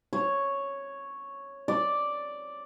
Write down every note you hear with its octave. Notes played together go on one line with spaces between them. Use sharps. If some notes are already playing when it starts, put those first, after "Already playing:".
C#5
D5